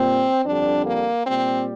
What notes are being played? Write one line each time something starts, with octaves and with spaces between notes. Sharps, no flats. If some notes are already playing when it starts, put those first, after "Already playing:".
Already playing: A#2 G3 C4
F2 D3 G3 D4
A#3
A#2 G3 C4